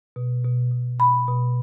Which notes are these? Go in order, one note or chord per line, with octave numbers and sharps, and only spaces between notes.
B2
B2
B2
B2 B5
B2